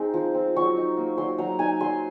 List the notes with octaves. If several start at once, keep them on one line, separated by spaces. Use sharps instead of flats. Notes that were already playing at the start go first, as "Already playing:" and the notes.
Already playing: G#3 C4 D#4
F3
C4
F#3 C#6
D#4
A#3
F#3 C6
F#3 A#5
D#4 G#5
F#3 C6